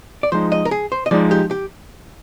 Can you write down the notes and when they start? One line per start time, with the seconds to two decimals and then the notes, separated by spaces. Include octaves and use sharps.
0.23 D5
0.32 F3 G#3 D#4 C5
0.52 D#5
0.65 A#4
0.71 G#4
0.92 C5
1.06 D#5
1.11 F3 G#3 D#4 D5
1.31 G4
1.51 G4